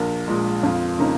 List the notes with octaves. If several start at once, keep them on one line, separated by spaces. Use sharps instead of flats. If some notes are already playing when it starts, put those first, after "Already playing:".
Already playing: A#1 A#4
A#2 G#3
F2 F4
C#3 A#3 D#4